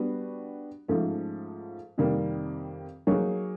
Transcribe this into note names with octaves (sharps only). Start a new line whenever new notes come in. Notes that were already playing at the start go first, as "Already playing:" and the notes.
Already playing: G3 B3 D4 F#4
G#2 F3 A3 C#4
F2 C3 D#3 G3 A#3
F#3 A#3 D#4 G#4 C#5